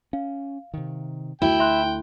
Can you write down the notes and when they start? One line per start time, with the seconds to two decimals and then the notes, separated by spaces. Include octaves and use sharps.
0.13 C#4 F5
0.74 C3 D#3
1.42 D2 A3 E4 F#4 G5
1.60 E5 C6 F#6